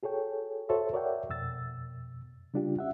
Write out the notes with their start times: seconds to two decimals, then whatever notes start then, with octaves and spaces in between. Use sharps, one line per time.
0.03 F#4 G#4 A4 C#5 G5
0.69 F#4 A4 C5 C#5 E5
0.93 A#4 C#5 D5 E5 F#5 G5
1.29 F2 B2 E6 A6
2.54 C#3 G3 D4 F4 G4
2.79 C#4 E5 F#5